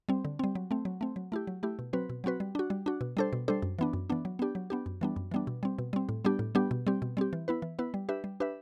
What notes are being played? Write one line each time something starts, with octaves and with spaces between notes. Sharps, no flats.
G3 C4
D3
G3 C4
F#3
A3 C4
F#3
A3 C4
F#3
A3 E4 G4
F#3
A3 E4 G4
B2
F#3 C4 F#4 B4
B2
F#3 C4 F#4 B4
G3
D4 F#4
G3
D4 F#4
B2
G3 D4 A4 C5
B2
G3 D4 A4 C5
F#2
E3 B3 D4
F#2
E3 B3 D4
F#3
B3 D4 G4
F#3
B3 D4 G4
F#2
E3 G3 B3 D4
F#2
E3 G3 B3 D4
B2
G3 C4
B2
G3 C4
A2
G3 B3 D4 G4
A2
G3 B3 D4 G4
B2
G3 C4 G4
B2
G3 C4 G4
E3
B3 E4 B4
E3
B3 E4 B4
G3
D4 G4 B4 E5
G3
D4 G4 B4 E5